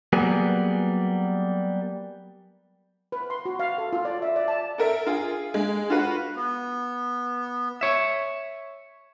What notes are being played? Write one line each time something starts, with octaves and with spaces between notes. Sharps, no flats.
F#3 G3 A#3 B3 G#4
B4
C6
F#4
F5
A4
F4
D5
E5
D5
A5
A4 A#4 E5
F4 G#4
G#3
F4 F#4 B4
B3
C#5 E5